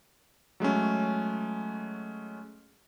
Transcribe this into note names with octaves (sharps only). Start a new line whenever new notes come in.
F#3 G#3 A3 C#4